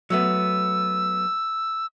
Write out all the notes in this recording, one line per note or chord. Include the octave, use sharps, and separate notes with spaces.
F#3 A3 B3 E6